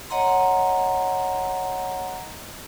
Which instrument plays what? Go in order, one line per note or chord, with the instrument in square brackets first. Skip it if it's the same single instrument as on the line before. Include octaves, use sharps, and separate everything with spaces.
[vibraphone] C#5 D#5 F#5 A#5 C6